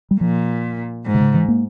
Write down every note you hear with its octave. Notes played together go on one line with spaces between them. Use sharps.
G3
A#2 F3
G#2
C3
C#3
E3
A#3